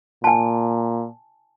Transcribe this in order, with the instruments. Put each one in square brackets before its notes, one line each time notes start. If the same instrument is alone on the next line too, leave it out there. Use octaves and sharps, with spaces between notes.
[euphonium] A#2 [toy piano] G#5 A5